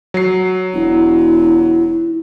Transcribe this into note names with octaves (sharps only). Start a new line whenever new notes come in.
F#3 C7
E1 E4